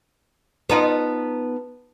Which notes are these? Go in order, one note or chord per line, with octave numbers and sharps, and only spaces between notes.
B3 D#4 F4 B4 A5